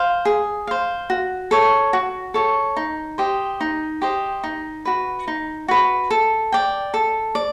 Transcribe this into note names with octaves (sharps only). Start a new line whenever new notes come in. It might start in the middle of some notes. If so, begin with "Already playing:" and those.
Already playing: C5 F5
G#4
C5 F5
F#4
A4 C#5
F#4
A4 C#5
D#4
G4 C5 D#5
D#4
G4 C5 D#5
D#4
F#4 B4
D#4
F#4 B4
A4
D5 G5
A4
D5